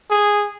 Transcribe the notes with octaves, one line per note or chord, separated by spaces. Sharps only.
G#4